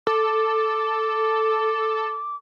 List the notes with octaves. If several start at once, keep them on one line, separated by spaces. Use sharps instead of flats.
A4 D6